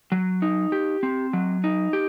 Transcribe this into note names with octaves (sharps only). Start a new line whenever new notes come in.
F#3
D#4
G4
C4
F#3
D#4
G4